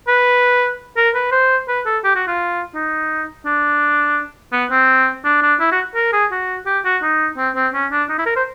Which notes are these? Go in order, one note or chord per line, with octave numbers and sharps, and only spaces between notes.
B4
A#4
B4
C5
B4
A4
G4
F#4
F4
D#4
D4
B3
C4
D4
D4
E4
F#4
A#4
G#4
F#4
G4
F#4
D#4
C4
C4
C#4
D4
D#4
E4
A#4
C5